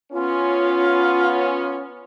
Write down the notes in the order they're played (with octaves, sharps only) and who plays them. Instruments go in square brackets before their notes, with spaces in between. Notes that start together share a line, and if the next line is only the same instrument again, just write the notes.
[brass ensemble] B3 C#4 [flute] F4